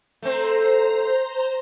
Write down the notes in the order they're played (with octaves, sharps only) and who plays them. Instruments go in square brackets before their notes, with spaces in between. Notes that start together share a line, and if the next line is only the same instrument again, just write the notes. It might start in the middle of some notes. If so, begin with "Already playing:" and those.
[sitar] A3 C4 [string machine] C5 A#5